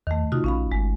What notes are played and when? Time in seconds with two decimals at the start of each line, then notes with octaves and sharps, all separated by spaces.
0.07 E2 D#3 A3
0.32 C3 D#4 F4 F#4
0.44 A#1 C#4 F5 B5
0.72 G1 G#3